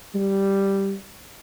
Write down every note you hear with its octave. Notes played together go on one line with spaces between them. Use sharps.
G3